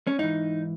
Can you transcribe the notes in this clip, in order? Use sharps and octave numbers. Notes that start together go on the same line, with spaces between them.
C#4
G#2 E3 D#4